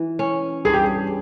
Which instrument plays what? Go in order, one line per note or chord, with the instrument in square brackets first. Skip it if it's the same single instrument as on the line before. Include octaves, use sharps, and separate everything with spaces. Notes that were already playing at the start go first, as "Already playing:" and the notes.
Already playing: [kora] E3
C#4
[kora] G2 [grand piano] G#4
[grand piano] G4
G#4